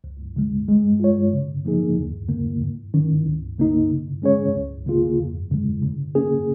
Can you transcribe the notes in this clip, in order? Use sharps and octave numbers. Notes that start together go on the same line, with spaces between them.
C#2
C#3 G#3
G#3
F4 C#5
C#3
F3 A#3 D#4 G#4
D#2
C#3 A#3
G#2
D#3 C#4
C#2
C#3 A#3 D#4
C#3
G#3 C#4 G#4 C#5
C#2
C#3 A#3 F4 G#4
F2
C#3 G#3
C#3
A#3 C#4 G#4